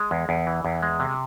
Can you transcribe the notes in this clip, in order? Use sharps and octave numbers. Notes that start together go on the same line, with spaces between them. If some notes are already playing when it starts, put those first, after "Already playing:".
Already playing: G#3
E2
E2
E3
E2
G#3
C3